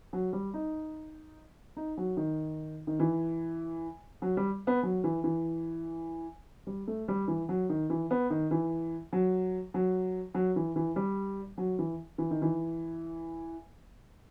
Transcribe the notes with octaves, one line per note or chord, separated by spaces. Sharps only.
F#3
G3
D#4
D#4
F#3
D#3
D#3
E3
F#3
G3
B3
F#3
E3
E3
G3
A3
G3
E3
F#3
D#3
E3
B3
D#3
E3
F#3
F#3
F#3
E3
E3
G3
F#3
E3
E3
D#3
E3